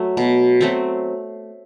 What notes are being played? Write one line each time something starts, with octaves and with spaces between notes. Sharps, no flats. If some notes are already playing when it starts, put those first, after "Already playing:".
Already playing: F#3 A3
B2
F#3 A3 C4